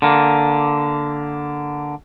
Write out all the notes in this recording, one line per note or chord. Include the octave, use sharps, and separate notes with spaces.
D3 A#3